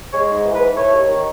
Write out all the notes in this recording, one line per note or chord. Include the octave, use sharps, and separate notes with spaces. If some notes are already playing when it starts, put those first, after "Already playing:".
G#3 C#5
G#2
E3
B4
E3
A3 C#5
D#2
D#3